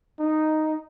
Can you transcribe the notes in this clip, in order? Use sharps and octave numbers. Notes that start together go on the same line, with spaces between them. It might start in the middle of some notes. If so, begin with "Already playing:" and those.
D#4